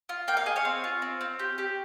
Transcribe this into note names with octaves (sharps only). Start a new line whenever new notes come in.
F4
A#3 G5
F5
G#4 D#5
C#5 F5
C4
F4
C4
C4
G4
G4